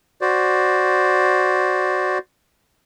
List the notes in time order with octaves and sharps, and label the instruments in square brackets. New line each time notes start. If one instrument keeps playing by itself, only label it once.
[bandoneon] F#4 C5 D5